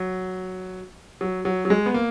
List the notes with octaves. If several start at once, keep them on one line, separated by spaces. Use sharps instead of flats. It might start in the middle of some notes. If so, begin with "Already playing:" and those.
Already playing: F#3
F#3
F#3
F#3
G#3
B3
A#3